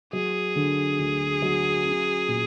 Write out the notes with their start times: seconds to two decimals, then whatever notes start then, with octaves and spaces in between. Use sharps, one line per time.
0.13 F#3 G#4
0.56 D3
0.99 D2
1.42 F#3
1.86 C#4
2.28 A#2